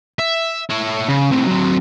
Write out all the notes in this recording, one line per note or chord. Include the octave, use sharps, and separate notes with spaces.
E5
E4 C#5
C#3
A2 C3
F#3 C4